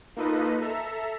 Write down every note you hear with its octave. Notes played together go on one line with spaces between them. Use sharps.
A#3 D#4 F4 A4 B4 D#5
A4 E5 A#5